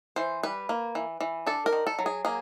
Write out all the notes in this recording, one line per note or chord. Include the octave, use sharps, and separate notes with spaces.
E3 C5
G3 B4
A#3
E3
E3
D4 A4
A#4
D#3
A4
F#3
G#4
A#3 G#4